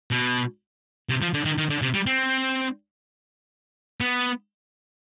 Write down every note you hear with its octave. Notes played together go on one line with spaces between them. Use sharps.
B2
C3
F3
D3
D#3
D#3
D3
C3
G3
C4
B3